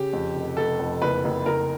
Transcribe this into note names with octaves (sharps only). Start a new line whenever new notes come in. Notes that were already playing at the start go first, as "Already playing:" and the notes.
Already playing: C#3 G4
F2
F1
F1 A4
F2
F#1 B4
F#1
F#1 A#4